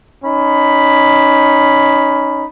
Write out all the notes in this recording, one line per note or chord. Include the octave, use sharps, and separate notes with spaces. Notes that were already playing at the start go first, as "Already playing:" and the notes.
C#4 D#4 B5